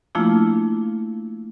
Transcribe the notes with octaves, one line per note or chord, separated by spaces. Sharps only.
F3 A3 A#3 D4 E4 F4